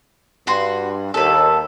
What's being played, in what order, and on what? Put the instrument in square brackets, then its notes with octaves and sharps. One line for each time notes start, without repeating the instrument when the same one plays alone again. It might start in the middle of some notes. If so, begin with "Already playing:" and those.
[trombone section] G2 [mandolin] F#4 B4 C6
[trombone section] D#2 [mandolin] A4 B4